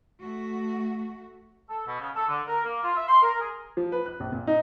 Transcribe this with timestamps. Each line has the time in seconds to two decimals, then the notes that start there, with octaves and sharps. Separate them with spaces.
0.22 A3 F#4
1.69 A4
1.87 B2
2.00 C#3
2.16 A4
2.28 D3
2.47 A#4
2.65 A#3
2.84 F4
2.96 E5
3.08 C6
3.22 A#4
3.40 G#4
3.77 F3
3.92 B4
4.06 F#6
4.20 A#1
4.32 A#2
4.47 D#4